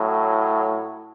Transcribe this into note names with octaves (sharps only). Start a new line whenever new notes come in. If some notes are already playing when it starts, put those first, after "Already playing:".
Already playing: A2 F#3